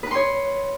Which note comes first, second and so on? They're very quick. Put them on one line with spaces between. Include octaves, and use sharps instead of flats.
B4 B5 C6 C#5